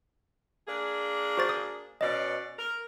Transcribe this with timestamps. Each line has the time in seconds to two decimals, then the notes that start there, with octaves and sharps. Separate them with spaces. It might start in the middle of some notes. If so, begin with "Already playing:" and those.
0.68 A#3 D4 G#4
1.37 F#4 C5 A6
1.49 D#6
2.01 B2 C#4 D5 D#5
2.59 A#4